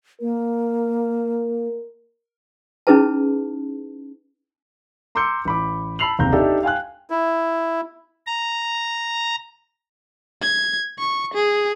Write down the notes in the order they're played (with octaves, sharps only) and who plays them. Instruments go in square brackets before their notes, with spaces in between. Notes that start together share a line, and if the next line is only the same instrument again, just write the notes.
[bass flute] A#3 [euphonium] A#4
[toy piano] C#4 D#4 E4 G#4 B4 A5
[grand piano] A#5 C6 D6 E6 G6 C#7
A1 B5 D6
A5 B5 E6 C7 F7 F#7
F#1 D#2 C3 A#5 G6
D4 D#4 G4 A4 E5
F5 G5 G#5 F#6
[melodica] E4
[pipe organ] A#5
[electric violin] G#6
C#6
G#4